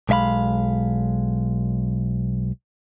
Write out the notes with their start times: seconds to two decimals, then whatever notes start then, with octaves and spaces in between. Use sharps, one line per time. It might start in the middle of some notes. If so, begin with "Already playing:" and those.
0.09 B1 G#3 E5 F5 B5